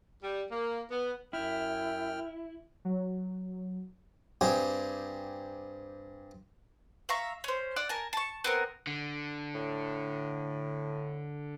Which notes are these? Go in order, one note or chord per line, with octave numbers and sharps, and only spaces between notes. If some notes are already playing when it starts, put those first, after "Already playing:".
G3
A#3
B3
F#2 E4 G5 F6
F#3
G2 C4 G4 G#4
E5 F5 A#5 C#6
C#4 C5
D5 F#5 E6
A#4 G#5 A5
A5 C#6
B3 C4 A#4
D3
A2